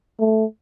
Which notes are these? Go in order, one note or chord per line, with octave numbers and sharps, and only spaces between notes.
A3